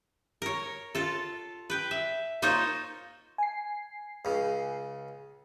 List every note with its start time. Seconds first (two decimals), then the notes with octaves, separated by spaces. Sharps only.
0.42 A#4 C#5
0.95 F4 A4
1.70 B4 G5
1.91 E5
2.42 A#3 D#4 F4 C5 C#5 D#5
3.38 G#5 C7
4.25 C#2 C#3